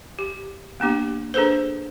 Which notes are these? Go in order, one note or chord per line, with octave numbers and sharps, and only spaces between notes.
G4
A#3 B3 D4 G4
D4 G#4 A4 B4 C5